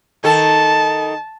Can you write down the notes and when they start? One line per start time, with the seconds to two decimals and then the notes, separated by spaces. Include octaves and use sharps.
0.24 D#3 A4 A5